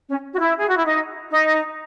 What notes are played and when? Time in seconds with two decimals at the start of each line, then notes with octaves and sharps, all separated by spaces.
0.09 C#4
0.34 F#4
0.39 E4
0.59 G#4
0.68 F#4
0.76 E4
0.85 D#4
1.31 D#4